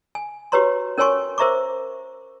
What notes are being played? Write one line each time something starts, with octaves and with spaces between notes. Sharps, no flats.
G#5
F#4 G4 B4 C#5 A#5 C6
C#4 A#4 C#5 G#5 C6 C#6
A#4 C5 E5 A#5 C#6 D6